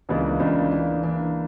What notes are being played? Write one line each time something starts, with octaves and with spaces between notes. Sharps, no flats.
C#2 C#3 E3 A#3 D4
C#2 C#3 E3 A#3 D4
E3 A#3 D4
E3 A#3 D4